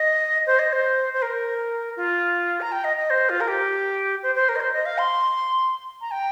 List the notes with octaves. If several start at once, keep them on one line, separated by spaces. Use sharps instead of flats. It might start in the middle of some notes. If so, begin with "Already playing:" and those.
Already playing: D#5
C5
D#5
C5
C5
A#4
F4
A#5
G5
D#5
D#5
C5
F4
A#4
G4
C5
C5
A#4
D#5
C5
D#5
F5
C6
A#5
G5